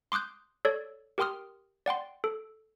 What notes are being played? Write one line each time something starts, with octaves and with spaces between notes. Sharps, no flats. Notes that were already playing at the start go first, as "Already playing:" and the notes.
C6 D6 D#6 F#6 G6
A4 C#5 D5
G4 A#4 G5 C6 D#6 F6
D5 F#5 G5 C6
A4